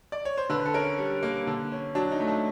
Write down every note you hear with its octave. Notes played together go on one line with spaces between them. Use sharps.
D5
C#5
C5
D3 B4
A4
C#4 A#4
G3
A#3
D3
C#4
F#3 D4
D#4
A3
D4